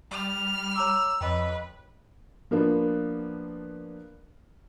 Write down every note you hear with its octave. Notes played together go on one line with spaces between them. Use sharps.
G3 F6
C#5 A#5 D6 E6
F2 B4 C#5 D#5 G5
F3 A#3 B3 D4